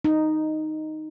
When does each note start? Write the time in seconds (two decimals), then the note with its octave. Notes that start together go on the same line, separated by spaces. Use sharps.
0.05 D#4